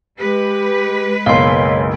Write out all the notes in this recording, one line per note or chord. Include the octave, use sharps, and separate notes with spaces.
G#3 G4 B4
F#1 B1 C#5 F5 C6